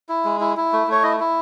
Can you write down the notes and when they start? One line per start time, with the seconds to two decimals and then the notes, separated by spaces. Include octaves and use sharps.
0.09 E4
0.25 G#3
0.41 E4
0.57 E4
0.73 A3
0.87 A3 C#5
1.03 E4 D#5
1.20 E4